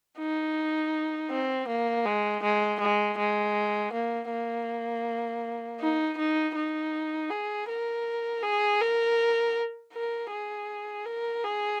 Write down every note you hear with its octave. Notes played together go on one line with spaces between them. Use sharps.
D#4
C4
A#3
G#3
G#3
G#3
G#3
A#3
A#3
D#4
D#4
D#4
G#4
A#4
G#4
A#4
A#4
G#4
A#4
G#4